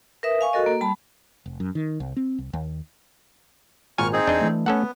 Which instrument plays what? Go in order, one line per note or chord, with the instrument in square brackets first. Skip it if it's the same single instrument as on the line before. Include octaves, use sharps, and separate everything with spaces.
[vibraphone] A#4 B4 E5 D#6
F5 G#5 C#6
F#4 A4 A#4 D#5
A#3
G3 A5 B5
[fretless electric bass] F1
F#2
D#3
C2
C4
C2
D#2
[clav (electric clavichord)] G#1 A#2 G#5 [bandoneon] C#6 F6
[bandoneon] C4 D#4 G#4
[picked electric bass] E1 E2 [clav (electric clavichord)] D4 D#5
[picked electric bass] E3 F3 A3
[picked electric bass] A3 [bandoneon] B3 [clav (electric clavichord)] C#4 A4 F#5